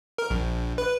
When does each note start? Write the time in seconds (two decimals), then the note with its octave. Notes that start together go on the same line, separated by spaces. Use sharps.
0.18 A#4
0.30 A#1
0.78 B4